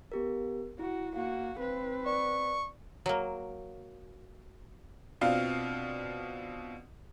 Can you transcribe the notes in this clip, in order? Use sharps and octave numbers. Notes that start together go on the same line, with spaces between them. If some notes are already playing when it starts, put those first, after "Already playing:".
B3 G4 A#4
E4 F#4
A#3 F#4 F5
C4 B4
D5 C#6
F#3 A#3
B2 C4 D4 F4 F5